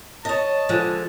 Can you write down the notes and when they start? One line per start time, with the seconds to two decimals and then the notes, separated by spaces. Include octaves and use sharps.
0.25 C#5 D#5 A5
0.69 D3 F3 G#3